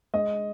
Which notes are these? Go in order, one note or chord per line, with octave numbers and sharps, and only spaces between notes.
G#3 D#5